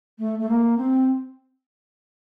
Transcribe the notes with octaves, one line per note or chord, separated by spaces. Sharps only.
A3
A3
A#3
C4